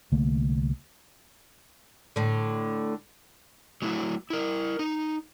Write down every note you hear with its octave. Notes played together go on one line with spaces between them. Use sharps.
C2 D3 A3 A#3
A2 D3
F#3 A3 E4 F#4
E4 A#4
D#4